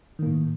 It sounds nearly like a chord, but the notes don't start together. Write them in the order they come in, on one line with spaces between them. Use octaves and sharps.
D#3 A#3 A2